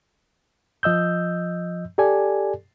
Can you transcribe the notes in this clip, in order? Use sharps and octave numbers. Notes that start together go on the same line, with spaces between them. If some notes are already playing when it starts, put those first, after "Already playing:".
F3 D#5 E6 G6
G4 A4 D5 G#5